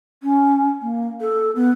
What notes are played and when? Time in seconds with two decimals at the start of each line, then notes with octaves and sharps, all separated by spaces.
0.23 C#4
0.82 A#3
1.21 A4
1.56 B3